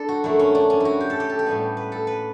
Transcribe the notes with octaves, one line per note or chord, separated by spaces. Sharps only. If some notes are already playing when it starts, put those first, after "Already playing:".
Already playing: D4 A4 B4
F#4
F#2 D3 A3 E4
C#4
D4
C#4
E4 F#4
G4
A4
G4
A4
G4
A2 G3 B3
B4
A4
B4